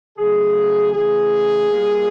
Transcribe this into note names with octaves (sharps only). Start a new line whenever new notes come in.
C#3 F#3 A3 G#4
C#3 E3 A3 G#4
A#2 G3 A#3